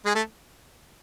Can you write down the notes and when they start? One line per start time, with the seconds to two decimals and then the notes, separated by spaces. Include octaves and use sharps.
0.05 G#3 G#4
0.15 A3 A4